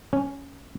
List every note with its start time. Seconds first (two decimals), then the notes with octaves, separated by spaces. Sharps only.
0.13 C#4